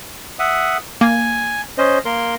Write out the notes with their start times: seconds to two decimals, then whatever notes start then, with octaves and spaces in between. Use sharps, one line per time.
0.39 E5 F#5 D#6
1.01 A#3 G#5
1.78 C#4 C5 D#5
2.05 A#3 A#4 C6